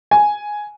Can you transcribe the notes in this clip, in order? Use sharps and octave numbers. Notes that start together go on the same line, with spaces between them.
G#5